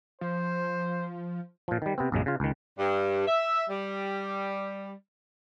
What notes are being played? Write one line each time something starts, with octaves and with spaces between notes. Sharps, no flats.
F3 C5
A#2 F3
D#3 G3
C3 B3 C4
A#1 F#2 C#3 G#3
C#3 F4
C#2 D#3
G2
E5
G3